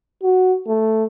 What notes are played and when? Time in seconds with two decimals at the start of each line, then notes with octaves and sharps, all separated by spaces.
0.23 F#4
0.67 A3